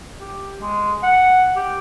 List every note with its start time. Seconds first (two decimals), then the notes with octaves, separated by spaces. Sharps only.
0.20 G4
0.61 G#3
1.03 F#5
1.56 G4